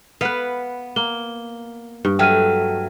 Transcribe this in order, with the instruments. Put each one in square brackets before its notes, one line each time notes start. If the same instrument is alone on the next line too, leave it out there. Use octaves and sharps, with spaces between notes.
[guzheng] B3 [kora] B4 F5
[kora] A#3 [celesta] G7
[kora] G2
[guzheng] F#3 A3 [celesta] G5 F6 D#7